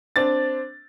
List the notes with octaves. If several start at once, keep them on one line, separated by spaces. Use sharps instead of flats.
C4 D4 A6